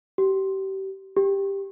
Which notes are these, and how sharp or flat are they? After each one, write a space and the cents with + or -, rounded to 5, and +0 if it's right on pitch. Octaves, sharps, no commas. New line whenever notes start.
G4 -30
G4 +10